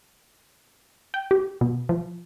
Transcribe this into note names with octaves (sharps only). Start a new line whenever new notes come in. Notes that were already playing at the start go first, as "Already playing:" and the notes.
G5
G4
B2
F3